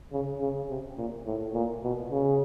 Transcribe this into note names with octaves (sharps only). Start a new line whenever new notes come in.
C#3
C#3
C3
A#2
A2
A#2
B2
C#3